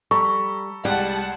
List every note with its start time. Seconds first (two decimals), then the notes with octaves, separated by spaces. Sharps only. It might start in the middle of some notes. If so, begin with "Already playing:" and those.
0.11 G3 A4 A#5 B5 C#6
0.85 C2 G3 G#3 F#5 A5